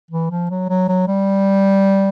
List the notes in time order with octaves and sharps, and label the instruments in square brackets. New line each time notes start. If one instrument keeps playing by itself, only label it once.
[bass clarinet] E3
F3
F#3
F#3
F#3
G3